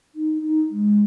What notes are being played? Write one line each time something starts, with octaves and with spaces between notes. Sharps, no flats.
D#4
D#4
G#3